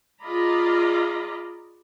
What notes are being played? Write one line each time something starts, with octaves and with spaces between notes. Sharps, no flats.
F4 G#4 D5 D#5 A#5 B5